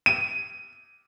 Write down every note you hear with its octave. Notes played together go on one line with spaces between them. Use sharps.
D#7